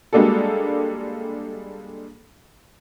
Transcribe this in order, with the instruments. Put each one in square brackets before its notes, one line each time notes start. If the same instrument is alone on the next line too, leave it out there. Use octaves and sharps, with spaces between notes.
[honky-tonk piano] G3 G#3 A#3 D4 F#4 A4